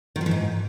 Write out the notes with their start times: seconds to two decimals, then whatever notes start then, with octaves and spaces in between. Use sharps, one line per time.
0.16 D#3
0.21 F3
0.26 E3
0.31 G#2